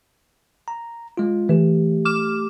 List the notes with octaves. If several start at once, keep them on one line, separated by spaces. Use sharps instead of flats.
A#5
G#3 F4
E3 A3 G4
D6 F6 E7